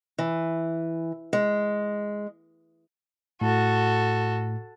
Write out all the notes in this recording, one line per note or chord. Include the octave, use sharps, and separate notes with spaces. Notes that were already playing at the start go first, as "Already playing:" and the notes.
E3
G#3
A2 F#4 A4